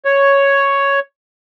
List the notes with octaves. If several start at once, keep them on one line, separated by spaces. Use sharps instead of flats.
C#5